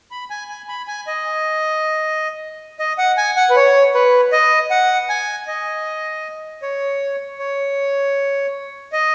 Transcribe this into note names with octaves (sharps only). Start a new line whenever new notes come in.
B5
G#5
G#5
B5
G#5
D#5
D#5
F#5
G#5
F#5
B4
C#5
B4
D#5
F#5
G#5
D#5
C#5
C#5
D#5